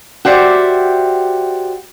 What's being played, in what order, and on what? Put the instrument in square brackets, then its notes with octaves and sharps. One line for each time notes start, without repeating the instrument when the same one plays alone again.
[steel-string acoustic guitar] F#4 G4 C5 D5 E5